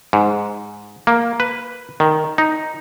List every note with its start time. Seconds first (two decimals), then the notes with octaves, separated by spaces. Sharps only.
0.13 G#2
1.07 A#3
1.40 B4
2.00 D#3
2.38 D#4